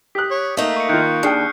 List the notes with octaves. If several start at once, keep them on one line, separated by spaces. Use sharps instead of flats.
G4 D#6 F#6 B6
C#5
A3 A#3 D#4
C#6 C#7
D#3 F4 F#6 G6 C#7
D#2 D4 G#4 G5 F6 C7 C#7